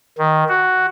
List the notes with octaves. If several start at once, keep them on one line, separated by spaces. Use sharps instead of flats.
D#3
F#4